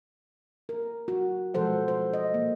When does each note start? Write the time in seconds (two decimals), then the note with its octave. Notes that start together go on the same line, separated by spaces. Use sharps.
0.69 A#4
1.08 F#4
1.54 B2 F3 G#3 A4 C5 F#5
1.88 C5
2.14 D#5
2.34 A#3